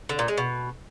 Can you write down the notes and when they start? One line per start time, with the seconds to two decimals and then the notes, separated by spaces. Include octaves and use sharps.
0.09 D3
0.19 A#2
0.28 G#3
0.38 B2